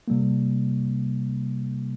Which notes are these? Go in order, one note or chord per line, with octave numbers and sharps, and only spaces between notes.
C3 G3 A#3